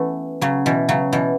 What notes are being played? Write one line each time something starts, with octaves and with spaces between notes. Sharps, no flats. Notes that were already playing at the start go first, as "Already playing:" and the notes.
Already playing: E3 A3 B3 C#4
C#3 F#3
B2 E3
C#3 F#3
B2 E3